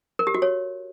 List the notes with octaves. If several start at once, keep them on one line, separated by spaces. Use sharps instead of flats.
A#4
G4
F#4
C#5